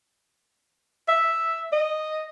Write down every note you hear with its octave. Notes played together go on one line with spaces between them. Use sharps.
E5
D#5